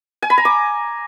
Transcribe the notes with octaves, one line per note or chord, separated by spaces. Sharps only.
G#5
B5
A#5
D6